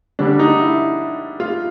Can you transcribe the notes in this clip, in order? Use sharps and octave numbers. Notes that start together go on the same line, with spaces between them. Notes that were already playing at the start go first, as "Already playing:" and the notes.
D3 G3 D4
D#4
E4
F4